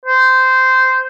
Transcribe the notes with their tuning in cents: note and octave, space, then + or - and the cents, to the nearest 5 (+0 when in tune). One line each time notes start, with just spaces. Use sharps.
C5 -10